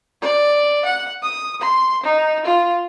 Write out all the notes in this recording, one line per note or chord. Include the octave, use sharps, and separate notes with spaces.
D5
F#5
D#6
C6
D#4
F4